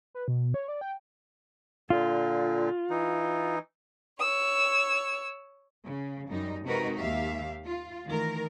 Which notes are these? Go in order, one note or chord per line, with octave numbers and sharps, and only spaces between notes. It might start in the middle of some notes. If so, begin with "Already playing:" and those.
B4
B2
C#5
D5
G5
A#2 D3 F4
E3 D#4
C#5 E6
C#3
F#2 G3 D#4
C3 G#3 D#4 F#4 A#4 B4
D#2 D#3 G4 E5 F5
F4
D#3 E3 A3 A#4